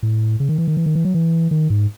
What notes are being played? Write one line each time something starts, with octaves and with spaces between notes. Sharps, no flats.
A2
C#3
D#3
E3
D#3
E3
D#3
E3
F#3
E3
D#3
G#2